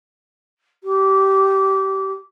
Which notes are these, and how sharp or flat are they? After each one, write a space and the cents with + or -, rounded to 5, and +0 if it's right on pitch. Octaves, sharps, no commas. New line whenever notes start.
G4 -20